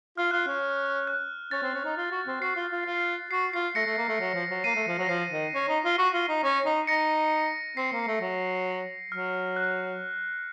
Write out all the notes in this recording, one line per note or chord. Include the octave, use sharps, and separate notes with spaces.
F4 F6
F4 F#6
C#4 F6
F#6
C#4 A6
C4
C#4
D#4
F4
F#4
C4
F#4 C7
F4
F4
F4
F#4 C7
F4 C7
A3 A#6 C#7
A3
A#3
A3
F#3
F3
F#3
A#3 C7 D#7
A3
F3
F#3
A#6
F3 C7
D#3
C#4
D#4
F4
F#4
F4
D#4
C#4
D#4
D#4 A#6 C#7
C4 C7
A#3
C7
A3
F#3
F#3 F6
F#6